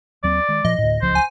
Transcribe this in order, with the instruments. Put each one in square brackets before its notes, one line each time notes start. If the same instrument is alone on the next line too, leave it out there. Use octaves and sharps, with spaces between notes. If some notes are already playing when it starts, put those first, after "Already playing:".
[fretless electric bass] D#2 F#3 C4 [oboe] D5
[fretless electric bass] D#3 G#3
[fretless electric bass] A#2 F3 [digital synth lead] D#5
[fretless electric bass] D2 A2
[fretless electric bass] D1 C#2 F3 [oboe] C5
[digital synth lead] G#5